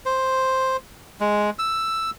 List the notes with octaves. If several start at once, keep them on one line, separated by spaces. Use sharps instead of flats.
C5
G#3
E6